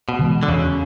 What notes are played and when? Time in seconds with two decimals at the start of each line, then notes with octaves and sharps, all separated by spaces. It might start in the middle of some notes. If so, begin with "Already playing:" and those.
0.09 B2
0.19 C#3 E3 G#3
0.43 D3
0.48 E2 C#3